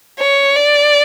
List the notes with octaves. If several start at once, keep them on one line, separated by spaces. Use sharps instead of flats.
C#5
D5